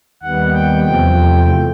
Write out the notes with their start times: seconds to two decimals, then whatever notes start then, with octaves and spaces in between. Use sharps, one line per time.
0.22 D#2 D#3 G3 B3 F#5
0.53 G5
0.84 E2 C3 F3 A3 G5